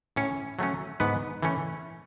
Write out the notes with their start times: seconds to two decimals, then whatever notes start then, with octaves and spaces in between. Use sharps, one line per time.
0.16 A2 C#4 C#5
0.59 F#3 A3 C#4
1.00 G#2 B3 B4
1.43 E3 A3 C#4